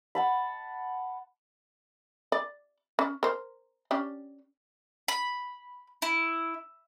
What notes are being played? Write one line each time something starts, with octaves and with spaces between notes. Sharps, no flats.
F#5 A5 B5
D5
C#4
A#4 C5
C#4 D4 G4
B5
E4